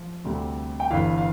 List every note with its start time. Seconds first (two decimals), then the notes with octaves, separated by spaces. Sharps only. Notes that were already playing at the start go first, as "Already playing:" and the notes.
Already playing: F3
0.25 D2 C3 G3 C4
0.80 G5
0.91 G1 G2 E3 F5
1.18 F5